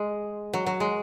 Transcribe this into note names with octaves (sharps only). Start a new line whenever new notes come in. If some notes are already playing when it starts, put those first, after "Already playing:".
Already playing: G#3
F#3
F#3
G#3